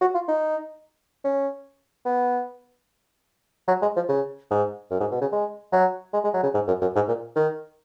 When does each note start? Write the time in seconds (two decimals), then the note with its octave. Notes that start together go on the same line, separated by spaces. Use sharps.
0.01 F#4
0.15 F4
0.28 D#4
1.24 C#4
2.05 B3
3.68 F#3
3.82 G#3
3.96 F3
4.09 C#3
4.50 G#2
4.91 F#2
5.00 G#2
5.12 B2
5.21 C#3
5.32 G#3
5.72 F#3
6.13 G#3
6.24 G#3
6.34 F#3
6.43 C#3
6.54 G#2
6.67 F#2
6.81 F#2
6.95 G#2
7.08 A#2
7.36 D#3